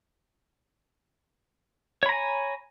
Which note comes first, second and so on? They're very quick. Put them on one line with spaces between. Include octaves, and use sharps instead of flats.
C#5 B5 A#5 G#5